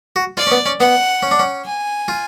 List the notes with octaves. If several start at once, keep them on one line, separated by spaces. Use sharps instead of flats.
F#4
F4 D5
C#4
B3
C#4
B3 F#5
C#4
D4
C#4
G#5
F4